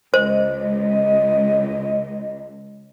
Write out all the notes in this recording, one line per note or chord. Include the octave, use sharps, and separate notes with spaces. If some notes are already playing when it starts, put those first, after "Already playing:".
C#2 C5 D#5